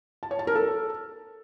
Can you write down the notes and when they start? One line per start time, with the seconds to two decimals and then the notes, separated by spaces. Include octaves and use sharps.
0.23 A5
0.31 C#5
0.39 A5
0.47 A#4
0.55 A4